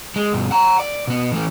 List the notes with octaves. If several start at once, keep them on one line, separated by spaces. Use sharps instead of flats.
G#3
G2 B2
F#5 A#5
D5
B2 B3
E3 A3